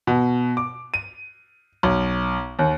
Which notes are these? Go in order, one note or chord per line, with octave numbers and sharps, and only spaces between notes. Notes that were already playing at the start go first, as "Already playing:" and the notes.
B2
D6
D#7
B1
D#2